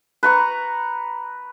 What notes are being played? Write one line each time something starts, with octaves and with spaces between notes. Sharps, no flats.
B4 A#5 C#6